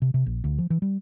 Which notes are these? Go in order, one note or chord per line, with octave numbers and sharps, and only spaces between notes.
C3
C3
A#1
D2
F3
E3
G3